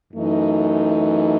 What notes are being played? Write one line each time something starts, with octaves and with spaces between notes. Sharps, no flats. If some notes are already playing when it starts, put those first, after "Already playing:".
F#2 E3 A3 D#4